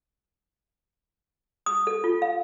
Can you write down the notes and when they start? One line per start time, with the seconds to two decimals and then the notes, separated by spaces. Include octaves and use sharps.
1.66 D#6
1.87 A4
2.04 F4
2.22 F5